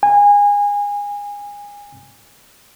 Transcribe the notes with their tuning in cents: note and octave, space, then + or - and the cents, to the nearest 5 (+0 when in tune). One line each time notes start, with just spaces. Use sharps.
G#5 -25